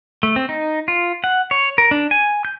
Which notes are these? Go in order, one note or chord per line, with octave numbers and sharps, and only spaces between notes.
A3
C4
D#4
F4
F#5
C#5
A#4
D4
G#5
G6